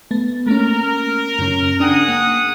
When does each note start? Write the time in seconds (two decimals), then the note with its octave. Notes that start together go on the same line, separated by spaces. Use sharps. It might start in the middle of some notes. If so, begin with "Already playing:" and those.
0.11 A3 B3 A6
0.46 A3 A#3 C#4 A#4
1.39 F#2 C#3 C#4
1.80 D4 G#4 F#5 G5 D#6
2.08 A#3